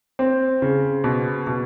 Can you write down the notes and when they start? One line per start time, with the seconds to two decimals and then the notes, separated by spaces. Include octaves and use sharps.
0.19 C4
0.62 C#3
1.04 B2
1.47 B2